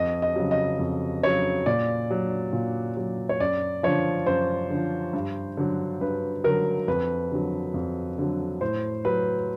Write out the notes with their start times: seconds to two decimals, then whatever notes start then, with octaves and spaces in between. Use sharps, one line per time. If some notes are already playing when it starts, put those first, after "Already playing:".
Already playing: F2 D#5
0.22 D#5
0.36 C#3 F#3
0.51 D#5
0.79 F2
1.23 C#3 F#3 C#5
1.66 A#2 D5
2.11 F#3
2.53 A#2
2.97 F#3
3.29 C#5
3.40 F#2 D5
3.83 D3 F3 C#5
4.26 F#2 C5
4.70 D3 F3
5.13 G2
5.57 D3 F#3
6.01 G2 B4
6.44 D3 F#3 A#4
6.88 F2 B4
7.32 D3 F#3
7.74 F2
8.18 D3 F#3
8.61 A2 C5
9.05 F#3 B4